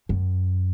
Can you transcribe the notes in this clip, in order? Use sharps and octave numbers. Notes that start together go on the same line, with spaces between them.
F#2